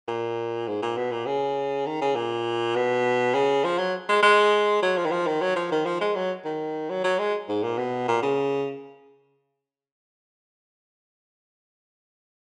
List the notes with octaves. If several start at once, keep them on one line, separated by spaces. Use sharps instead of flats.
A#2
G#2
A#2
B2
A#2
C#3
D#3
C#3
A#2
B2
C#3
F3
F#3
G#3
G#3
F#3
F3
D#3
F3
D#3
F#3
F3
D#3
F3
G#3
F#3
D#3
F#3
F#3
G#3
G#2
A#2
B2
A#2
C#3